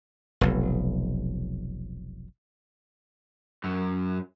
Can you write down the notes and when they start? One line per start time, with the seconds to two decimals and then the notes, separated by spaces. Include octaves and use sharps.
0.41 F1 B1
3.64 F#2 F#3